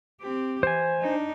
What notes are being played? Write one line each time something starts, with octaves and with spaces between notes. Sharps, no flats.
C4 G4
E3 C5 G#5
D4 D#4